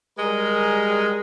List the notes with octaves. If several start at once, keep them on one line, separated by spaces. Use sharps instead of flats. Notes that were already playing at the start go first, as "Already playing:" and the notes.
G3 G#3 G#4 A#4